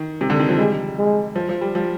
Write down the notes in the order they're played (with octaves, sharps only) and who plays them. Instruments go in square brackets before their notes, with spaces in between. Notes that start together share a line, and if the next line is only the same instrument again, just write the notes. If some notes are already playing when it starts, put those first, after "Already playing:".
Already playing: [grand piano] D#3
C3
D3
D#3
F3
[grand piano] G3 [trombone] G#3
[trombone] G#3
[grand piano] F3
F3
G3
F3